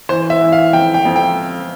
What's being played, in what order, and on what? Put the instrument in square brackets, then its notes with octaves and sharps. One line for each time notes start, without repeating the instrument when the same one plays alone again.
[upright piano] E3 [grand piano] C5
[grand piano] E5
[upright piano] E3
[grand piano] F5
[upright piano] F2 [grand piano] G5
[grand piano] G5
[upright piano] F2
[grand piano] G5